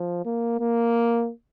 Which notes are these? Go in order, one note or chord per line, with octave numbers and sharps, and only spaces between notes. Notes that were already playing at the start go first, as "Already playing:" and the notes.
Already playing: F3
A#3
A#3